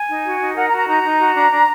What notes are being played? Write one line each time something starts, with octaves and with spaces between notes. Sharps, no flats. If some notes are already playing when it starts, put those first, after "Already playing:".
Already playing: G#5
D#4
F#4
D#4
A#4 F#5
A#5
F#4
A#5
D#4 A#5
D#4
F#4
D4
D4